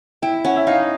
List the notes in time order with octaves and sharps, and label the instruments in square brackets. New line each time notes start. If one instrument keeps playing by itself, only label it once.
[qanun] E4 [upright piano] G5
[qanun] C#4 [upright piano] F#5
[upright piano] E5
[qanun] D#4 [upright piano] F5